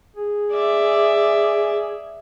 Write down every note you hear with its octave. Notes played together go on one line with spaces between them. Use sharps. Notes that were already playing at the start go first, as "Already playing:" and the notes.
G#4
D5 E5